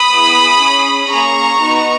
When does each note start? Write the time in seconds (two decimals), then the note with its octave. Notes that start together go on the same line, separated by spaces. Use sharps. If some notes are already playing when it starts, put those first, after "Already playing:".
Already playing: B5 D#6
0.11 B3 E4 G#4
0.60 C#4 G#4
1.10 A#3 C#4 G#4 A#5 C#6
1.59 B3 D#4 F#4